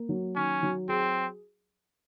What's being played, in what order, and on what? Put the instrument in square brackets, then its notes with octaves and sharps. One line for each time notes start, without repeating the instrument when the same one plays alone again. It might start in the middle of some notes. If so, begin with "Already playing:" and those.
Already playing: [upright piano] A#3
F#3
[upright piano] D#3 [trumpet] C#4
[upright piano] F#3
[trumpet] C4 [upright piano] G#4